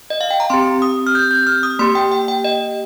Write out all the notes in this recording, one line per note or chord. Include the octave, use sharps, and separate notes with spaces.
D#5
F5
G5
A#5
C4 G4 C6
D#6
F6
G6
G6
F6
D#6
A#3 G4 C6
G5
G5
G5
D#5